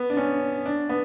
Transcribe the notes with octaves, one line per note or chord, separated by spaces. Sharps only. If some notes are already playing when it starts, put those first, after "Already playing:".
Already playing: B3
D4
C#4
D4
B3